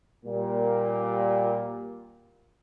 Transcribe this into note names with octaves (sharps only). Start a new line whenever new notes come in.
A#2 G3 A#3